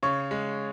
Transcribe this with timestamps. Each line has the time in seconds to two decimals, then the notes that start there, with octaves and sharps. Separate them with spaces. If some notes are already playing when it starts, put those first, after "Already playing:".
0.03 C#3 C#5 C#6
0.31 G#3